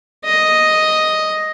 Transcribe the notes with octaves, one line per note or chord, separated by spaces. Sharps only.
D#5